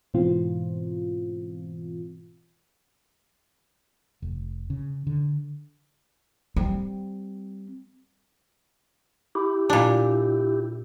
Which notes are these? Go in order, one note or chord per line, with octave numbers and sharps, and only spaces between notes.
G#2 B2 E3 C4 F4
F1
C#3
D3
G3 C4
E4 G4
A#2 D4